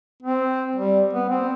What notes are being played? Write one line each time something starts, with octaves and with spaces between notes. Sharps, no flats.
C4
G3
B3
C4